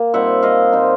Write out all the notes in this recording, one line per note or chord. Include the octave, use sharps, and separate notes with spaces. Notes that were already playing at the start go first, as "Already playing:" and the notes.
Already playing: A#3
A#2 G3 C4 D#4 E5 F#5
D#5 F5
A#2 G3 C4 D#4